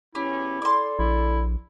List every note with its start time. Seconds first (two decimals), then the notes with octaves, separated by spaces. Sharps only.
0.15 E2 B2 C#4 E4 G4
0.62 A4 D5 C6 D6
0.99 A#1 E4